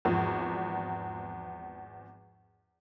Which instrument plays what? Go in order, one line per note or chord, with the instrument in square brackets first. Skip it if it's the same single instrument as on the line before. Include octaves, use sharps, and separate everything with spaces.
[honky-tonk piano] G#1 E2 F3